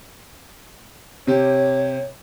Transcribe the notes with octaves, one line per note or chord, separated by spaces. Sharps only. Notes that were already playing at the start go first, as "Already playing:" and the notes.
C3 G4 C#5